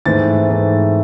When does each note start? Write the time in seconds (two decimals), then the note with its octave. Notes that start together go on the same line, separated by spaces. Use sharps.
0.06 G#2 E3 A3 C4 A6
0.49 G#2 E3 A3 C4